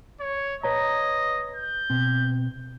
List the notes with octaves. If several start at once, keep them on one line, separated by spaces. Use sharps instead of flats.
C#5
B4 C#5 D#5 A#5
G6
B2 C4